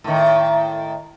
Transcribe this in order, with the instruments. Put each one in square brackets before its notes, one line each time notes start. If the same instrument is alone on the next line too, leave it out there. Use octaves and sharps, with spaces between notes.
[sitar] A2 D#3